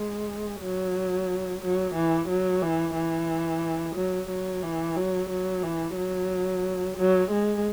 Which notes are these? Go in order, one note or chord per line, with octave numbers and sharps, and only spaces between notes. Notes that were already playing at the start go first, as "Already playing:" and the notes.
Already playing: G#3
F#3
F#3
E3
F#3
E3
E3
F#3
F#3
E3
F#3
F#3
E3
F#3
F#3
G#3